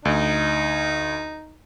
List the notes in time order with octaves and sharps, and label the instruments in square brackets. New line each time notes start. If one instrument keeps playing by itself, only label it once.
[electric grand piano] D2 [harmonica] D#4